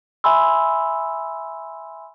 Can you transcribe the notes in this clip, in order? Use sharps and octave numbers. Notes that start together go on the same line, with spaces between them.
E5 G#5 B5 C6 E6